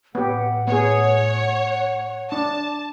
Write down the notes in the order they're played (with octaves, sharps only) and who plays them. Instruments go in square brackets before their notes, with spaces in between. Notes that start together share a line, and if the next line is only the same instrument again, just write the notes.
[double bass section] A2 [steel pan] B3 G4 [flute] F#5
[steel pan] B3 G#4 [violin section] C#5
[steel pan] D4 [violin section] A5